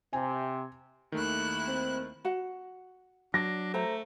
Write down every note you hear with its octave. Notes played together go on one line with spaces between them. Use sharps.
C3 C4 G#5
D#2 D#3 A3 E4 F#6
C4
F#4 F#5
F#3 D4 A#6
A3 C5 A#5